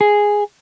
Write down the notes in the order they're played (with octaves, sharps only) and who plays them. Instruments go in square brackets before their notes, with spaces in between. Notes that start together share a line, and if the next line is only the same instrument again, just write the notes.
[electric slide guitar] G#4